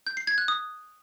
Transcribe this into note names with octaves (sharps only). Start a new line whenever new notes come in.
G6
C7
G#6
F#6
D#6